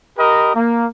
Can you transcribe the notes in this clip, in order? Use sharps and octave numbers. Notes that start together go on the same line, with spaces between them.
G4 A#4 D#5 B5
A#3